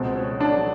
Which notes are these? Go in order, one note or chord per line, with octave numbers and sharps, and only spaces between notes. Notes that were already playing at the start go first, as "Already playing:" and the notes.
Already playing: C#2 B2 C4
C#4
D4